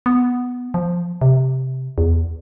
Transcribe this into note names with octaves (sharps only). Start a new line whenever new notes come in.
B3
F3
C3
E2